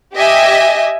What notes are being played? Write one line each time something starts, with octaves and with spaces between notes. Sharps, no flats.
G4 D#5 E5 G#5